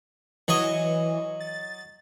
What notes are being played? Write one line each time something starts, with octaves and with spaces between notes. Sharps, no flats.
E3 F#3 C#5 D#5
A6